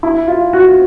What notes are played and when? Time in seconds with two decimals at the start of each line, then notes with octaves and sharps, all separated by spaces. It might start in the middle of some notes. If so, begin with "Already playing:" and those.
0.03 E4
0.28 F4
0.53 F#4